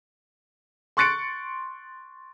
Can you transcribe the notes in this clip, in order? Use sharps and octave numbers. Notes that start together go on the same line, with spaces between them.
C6 C#6 F#6 A6 C#7 D7